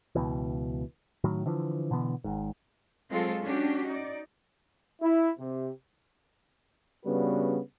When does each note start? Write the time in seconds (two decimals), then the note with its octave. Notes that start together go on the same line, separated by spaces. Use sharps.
0.15 C#2 B2 E3
1.24 A2 D#3 F#3
1.46 D3 E3 F3
1.91 B2 D3 E3 B3
2.24 G#1 G#2
3.10 F#3 G#3 C4 F4 A4
3.43 C#4 D4 F#4 G4
3.87 D#4 D5
5.01 E4
5.38 C3
7.05 C#3 G3 B3 D4 F#4 B4